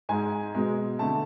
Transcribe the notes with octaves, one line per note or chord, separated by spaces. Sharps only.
G#2 G#3 G#5
B2 G#3
D3 A3 A5